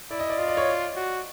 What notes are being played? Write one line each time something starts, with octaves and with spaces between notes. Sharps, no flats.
E4 D5
D#5
D5
F4 D#5
D5
C#5
D5
F#4